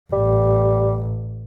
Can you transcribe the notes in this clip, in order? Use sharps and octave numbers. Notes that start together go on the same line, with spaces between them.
A1 G3